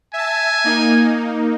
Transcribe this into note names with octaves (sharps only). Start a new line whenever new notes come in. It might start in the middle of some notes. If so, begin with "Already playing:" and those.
E5 G#5 A5
A#3 D#4